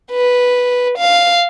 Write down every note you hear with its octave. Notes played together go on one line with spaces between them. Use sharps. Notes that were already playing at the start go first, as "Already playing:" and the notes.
B4
F5